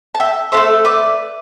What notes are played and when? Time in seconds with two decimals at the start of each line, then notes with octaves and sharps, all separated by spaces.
0.15 A5
0.20 E5 G5
0.52 D4 A4 C5 E5
0.57 A3
0.85 B4 D5